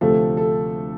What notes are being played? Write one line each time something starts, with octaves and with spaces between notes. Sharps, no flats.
D2 C3 F3 A3 A4
A4